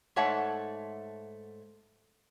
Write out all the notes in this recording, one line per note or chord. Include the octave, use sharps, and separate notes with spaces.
G#2 A3 C#5 E5 F#5 A5